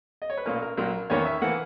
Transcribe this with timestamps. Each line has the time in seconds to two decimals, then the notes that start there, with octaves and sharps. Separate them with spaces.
0.22 D#5
0.30 C#5
0.37 B4
0.45 B1 A#2 A#3 C#4 A#4
0.62 A#4
0.77 A#1 A#2 F#3 A#4
1.10 E2 D#3 A#3 C#4 C#5
1.25 E5
1.42 E3 A#3 F#5